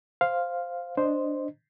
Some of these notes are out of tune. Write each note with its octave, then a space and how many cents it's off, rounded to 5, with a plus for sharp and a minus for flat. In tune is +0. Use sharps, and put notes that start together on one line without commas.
C5 +0 F5 +0
D4 +0 C5 +0 D#5 -10